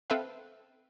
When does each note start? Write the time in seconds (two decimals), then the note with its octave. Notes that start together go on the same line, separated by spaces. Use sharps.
0.10 C4 A4 B4 E5 F5